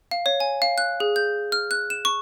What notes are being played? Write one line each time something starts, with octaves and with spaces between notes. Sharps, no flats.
F5
C#5
G#5
F5
F#6
G#4
G6
F6
F#6
E7
C#6